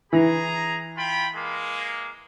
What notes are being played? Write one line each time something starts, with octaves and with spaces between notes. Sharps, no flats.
E3 G#4 A#5
F4 G5 B5
G#3 A#3